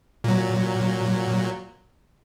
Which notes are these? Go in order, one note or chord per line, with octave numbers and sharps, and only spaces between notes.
A#2 F#3